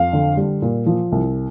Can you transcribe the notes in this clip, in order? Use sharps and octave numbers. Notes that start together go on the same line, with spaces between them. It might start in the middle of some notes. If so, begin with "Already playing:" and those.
Already playing: F2 F5
D3
G3
A#2
F3
C2